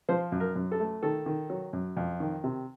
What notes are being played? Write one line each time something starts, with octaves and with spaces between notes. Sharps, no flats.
F3 C5
F#2
A#4
F#2
A4
A3
D#3 A4
D#3
F#3
F#2
F2
D#3
C3